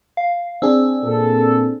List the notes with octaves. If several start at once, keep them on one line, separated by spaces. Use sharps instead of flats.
F5
C4 D4 G#4 E6
A#2 A4